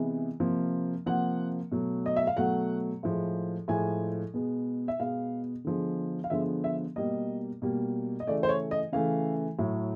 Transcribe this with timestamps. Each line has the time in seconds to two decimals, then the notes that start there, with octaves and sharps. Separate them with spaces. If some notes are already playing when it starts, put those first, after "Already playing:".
Already playing: C3 E3 G#3 B3
0.40 C3 F3 A#3
1.06 C3 F3 A#3 F#5
1.71 B2 F#3 A3
2.06 D#5
2.16 E5
2.27 F5
2.37 B2 F#3 A3 F#5
3.03 A2 F3 G#3
3.68 A2 F3 G#3 G#5
4.34 B2 G#3 B3
4.88 E5
5.00 B2 G#3 B3 F5
5.64 D3 F3 G#3 B3
6.24 F5
6.30 D3 F3 G#3 B3 E5
6.64 E5
6.96 B2 G3 A#3 D#5
7.62 B2 G3 A#3
8.20 D#5
8.27 C#3 E3 A3 D5
8.43 C5
8.49 C#5
8.71 D#5
8.92 C#3 E3 A3 F5
9.59 A2 F#3 A3